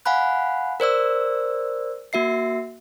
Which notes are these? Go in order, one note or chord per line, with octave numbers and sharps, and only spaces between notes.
F5 F#5 G#5 B5 F#6
A#4 C5 D5 E6
A#3 F#4 E5 C7